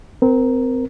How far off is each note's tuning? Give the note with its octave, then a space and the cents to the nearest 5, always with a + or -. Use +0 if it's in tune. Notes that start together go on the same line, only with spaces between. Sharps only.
C4 -25 A#4 +0